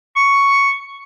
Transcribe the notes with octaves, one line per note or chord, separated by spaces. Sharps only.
C#6